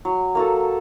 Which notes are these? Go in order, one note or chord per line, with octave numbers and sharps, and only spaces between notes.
F#3
A#3 F#4 A4